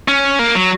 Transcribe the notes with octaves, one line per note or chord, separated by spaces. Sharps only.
C#4
A#3
F#3